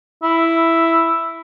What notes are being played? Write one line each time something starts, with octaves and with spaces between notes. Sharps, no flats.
E4